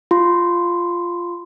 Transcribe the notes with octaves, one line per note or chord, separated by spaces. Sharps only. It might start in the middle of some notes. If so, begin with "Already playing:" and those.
F4 C6